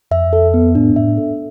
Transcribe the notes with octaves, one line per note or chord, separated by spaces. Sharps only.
F2 E5
A4
B3
A2 D4
A2 E5
A4